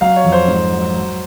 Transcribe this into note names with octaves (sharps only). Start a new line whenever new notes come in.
F#3 F5
C#5
F2
C5
G#2
F#3
F#3